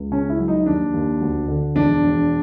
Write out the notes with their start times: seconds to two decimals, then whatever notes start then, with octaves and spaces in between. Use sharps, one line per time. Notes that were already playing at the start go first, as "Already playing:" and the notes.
Already playing: C#2
0.11 C#3 C#4
0.29 E4
0.39 F#3
0.48 D#4
0.66 D#2 D4
0.93 D#2
1.21 D2
1.48 D3
1.75 E1 D4
2.03 E1